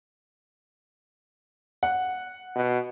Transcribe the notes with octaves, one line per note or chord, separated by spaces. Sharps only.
F#5
B2